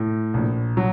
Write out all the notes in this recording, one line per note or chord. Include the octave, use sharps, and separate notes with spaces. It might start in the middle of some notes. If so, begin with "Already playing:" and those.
Already playing: A2
A#1
F#3